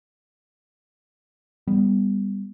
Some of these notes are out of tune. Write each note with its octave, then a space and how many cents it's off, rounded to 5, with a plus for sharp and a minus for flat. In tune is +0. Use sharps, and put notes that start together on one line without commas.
G3 +20 B3 +0